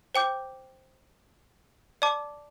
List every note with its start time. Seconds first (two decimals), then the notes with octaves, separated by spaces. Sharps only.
0.15 C5 G5 D6 G6
2.02 D5 A5 D6